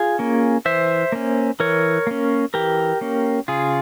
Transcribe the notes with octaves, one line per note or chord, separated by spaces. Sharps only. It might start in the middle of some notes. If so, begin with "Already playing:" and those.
Already playing: F4 G#4
A#3 C#4
E3 C5 E5
A#3 C#4
E3 A#4 C#5
A#3 C#4
E3 G4 A#4
A#3 C#4
C#3 F4 G#4